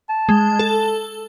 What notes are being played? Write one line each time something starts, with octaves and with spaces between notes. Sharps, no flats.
A5
G#3
A4